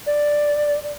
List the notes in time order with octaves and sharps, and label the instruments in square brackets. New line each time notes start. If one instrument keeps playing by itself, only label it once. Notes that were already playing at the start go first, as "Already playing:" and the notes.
[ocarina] D5